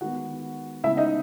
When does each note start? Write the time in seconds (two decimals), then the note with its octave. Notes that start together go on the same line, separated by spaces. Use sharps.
0.01 D#3 G#3 B3 F#4 F#5
0.84 C#3 G#3 B3 E4 E5
0.97 D#4 D#5